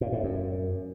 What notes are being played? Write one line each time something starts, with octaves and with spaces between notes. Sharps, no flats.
A#2
A2
F#2